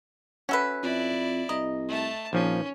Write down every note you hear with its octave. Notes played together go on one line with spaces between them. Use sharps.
C#4 F#4 A4 B4 E5
F2 E4 D5
C2 D#5 A#5
A3 A5
A#1 D#3 F3 C#4